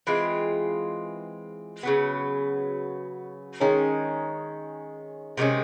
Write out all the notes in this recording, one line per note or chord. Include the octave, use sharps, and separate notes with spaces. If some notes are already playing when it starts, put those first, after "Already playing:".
E3 G#3 C4 F4
C#3 F#3 B3
D#3 G#3 C#4
C3 D#3 G#3 C#4